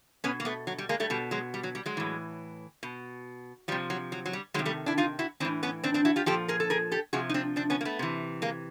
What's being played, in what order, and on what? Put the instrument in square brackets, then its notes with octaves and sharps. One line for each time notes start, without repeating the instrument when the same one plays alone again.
[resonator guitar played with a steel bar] B2 B3 C#4
A#3
A3 B3
F#3
G3
G#3 A#3
G3 A3
B2 G3
F#3 G#3
G3
F#3
G3
F#3 G#3
A2 E3
B2
F3 G3
C3
F#3
F#3
F#3
G3
D#3 F#3 G#3
C3
G3 A3
D4 E4
D#4 F4
E4 F#4
A2 E3 C4 D4
B3 C#4
C4 D4
C4 D4
E4 F#4
F4 G4
A#2 F3 G4 A4
G#4 A#4
A4
G#4 A#4
G4 A4
C3 F3 F#4 G#4
D#4
C4 D4
C4 D4
B3 C#4
A#3
A3 B3
C3 E3
G#3 A#3